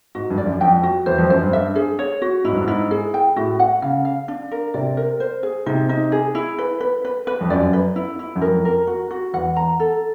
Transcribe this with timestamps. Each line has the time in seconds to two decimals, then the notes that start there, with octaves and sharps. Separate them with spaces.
0.15 G#2 F#4
0.30 G2
0.38 D5
0.46 F#2
0.61 F2 G5
0.83 F#4
1.06 E2 C5
1.18 F2
1.30 F#2 C5
1.42 G2
1.53 E5
1.76 G#4
1.99 C#5
2.22 F#4
2.45 G#2 E4
2.52 G2
2.61 G#2
2.68 E4
2.91 G#4
3.14 G5
3.36 A2 F#4
3.59 F#5
3.82 C#3 F5
4.05 F5
4.28 D4
4.52 A#4
4.74 C3 D5
4.97 A#4
5.20 C5
5.43 G#4
5.66 C3 D#4
5.89 D#4
6.12 G#4
6.35 E4
6.59 B4
6.81 B4
7.05 B4
7.27 B4
7.41 F2
7.50 F#2 D5
7.73 B4
7.96 E4
8.19 E4
8.36 F#2
8.41 F2 A#4
8.65 A#4
8.87 F#4
9.11 F#4
9.33 E2 F#5
9.56 A#5
9.80 A4